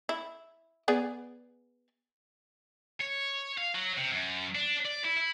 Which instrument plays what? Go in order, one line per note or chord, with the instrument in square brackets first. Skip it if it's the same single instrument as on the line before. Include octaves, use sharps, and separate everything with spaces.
[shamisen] E4
B3 G#4 D5
[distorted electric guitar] C#5
F5
F#3
C3
F#2
D4
D5
E4
E4